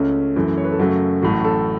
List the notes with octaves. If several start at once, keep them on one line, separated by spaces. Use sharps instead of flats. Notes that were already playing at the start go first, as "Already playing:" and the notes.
Already playing: C#2 C#3 A3 C#4
F#2 E3 A3
C#5
B4
A4
F#2 C#3 F#3 A3 F#4
A1 A2 F#3 F#4
A4